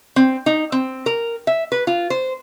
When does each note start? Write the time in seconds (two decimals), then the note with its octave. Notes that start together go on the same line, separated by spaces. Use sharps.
0.16 C4
0.46 D#4
0.72 C4
1.06 A#4
1.47 E5
1.72 B4
1.87 F4
2.10 C5